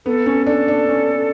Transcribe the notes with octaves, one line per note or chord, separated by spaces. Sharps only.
B3 A4
C#4
D4 A4
D4
C#4